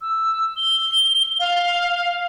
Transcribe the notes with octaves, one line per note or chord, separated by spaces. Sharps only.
E6
G7
F5